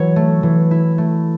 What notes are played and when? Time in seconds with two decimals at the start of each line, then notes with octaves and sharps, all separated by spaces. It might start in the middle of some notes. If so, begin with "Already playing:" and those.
Already playing: E3 F#3 C#5
0.16 A3
0.43 E3
0.71 E4
0.98 A3